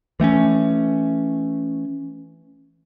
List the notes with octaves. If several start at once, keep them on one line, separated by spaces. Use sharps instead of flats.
E3 A3 C4 C#4